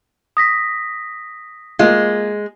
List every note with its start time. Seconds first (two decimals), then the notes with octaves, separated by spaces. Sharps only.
0.37 D#6 A#6 B6
1.79 G#3 A#3 F4